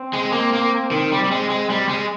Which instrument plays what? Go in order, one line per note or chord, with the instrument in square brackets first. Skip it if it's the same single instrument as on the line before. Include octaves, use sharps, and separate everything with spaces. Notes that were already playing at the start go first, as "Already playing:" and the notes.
Already playing: [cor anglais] C4
[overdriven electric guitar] G#3
A#3
A#3
D#3
G3
G3
G#3
G#3
G3
G#3